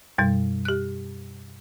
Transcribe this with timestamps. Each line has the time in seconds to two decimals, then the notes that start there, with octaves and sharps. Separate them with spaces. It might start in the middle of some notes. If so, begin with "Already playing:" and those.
0.18 F#2 B2 G3
0.65 G4 F#6